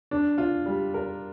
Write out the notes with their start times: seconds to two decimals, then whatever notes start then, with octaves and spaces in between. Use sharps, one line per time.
0.11 D4
0.38 F4
0.66 G3
0.94 A#4